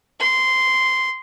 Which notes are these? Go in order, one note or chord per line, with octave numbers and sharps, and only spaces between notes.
C6